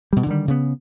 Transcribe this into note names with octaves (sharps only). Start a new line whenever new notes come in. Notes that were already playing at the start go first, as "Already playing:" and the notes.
B2 G3
D3 D#3 G3
C#3 B3